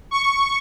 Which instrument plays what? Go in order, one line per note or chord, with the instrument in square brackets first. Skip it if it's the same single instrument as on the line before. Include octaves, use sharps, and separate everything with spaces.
[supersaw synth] C#6